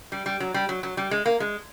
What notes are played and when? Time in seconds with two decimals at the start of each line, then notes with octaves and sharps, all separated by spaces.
0.12 G3
0.26 G3
0.40 F#3
0.54 G3
0.69 F#3
0.83 F#3
0.97 G3
1.11 G#3
1.26 A#3
1.40 G#3